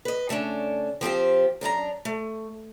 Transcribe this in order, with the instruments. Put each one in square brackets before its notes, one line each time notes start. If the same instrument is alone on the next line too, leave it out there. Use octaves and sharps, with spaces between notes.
[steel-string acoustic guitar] B4 D#5
C#3 A3 C#4 D4
F3 C4 F4 G4
F#2 D4 E4 A#5
A3